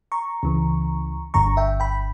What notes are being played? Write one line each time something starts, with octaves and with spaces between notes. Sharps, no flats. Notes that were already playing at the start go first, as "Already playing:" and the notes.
A#5 C#6
C#2 C#3 E3
G1 G2 D3 A#5 C#6
E5 G5
G5 B5